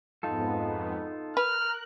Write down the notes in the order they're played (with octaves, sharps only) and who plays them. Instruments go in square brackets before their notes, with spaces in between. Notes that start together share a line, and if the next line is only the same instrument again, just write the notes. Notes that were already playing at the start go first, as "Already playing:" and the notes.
[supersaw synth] F2 G#2 B3 [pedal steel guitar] D#4 F4 A4
[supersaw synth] A#4 F#6 [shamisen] B4 [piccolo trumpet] F6